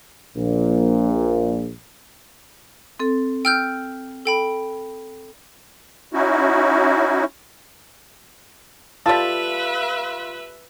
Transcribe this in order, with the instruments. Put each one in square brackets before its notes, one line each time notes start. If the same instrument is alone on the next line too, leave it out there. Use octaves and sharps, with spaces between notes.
[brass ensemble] A#1 A#2
[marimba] C4 A4
[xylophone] G5 F6 G6 [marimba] E6
[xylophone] A4 G5 B5
[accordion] C#4 D#4 E4 F#4
[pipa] G3 A4 [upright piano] F4 [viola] B4 E5 [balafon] A5